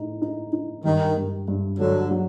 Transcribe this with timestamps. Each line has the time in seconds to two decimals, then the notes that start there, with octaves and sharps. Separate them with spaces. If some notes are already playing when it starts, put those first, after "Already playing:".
Already playing: A2 D#4
0.22 D#4
0.53 D#4
0.85 G2 D#3
1.17 G2
1.48 G2
1.79 G2 D3 F#3
2.11 F#3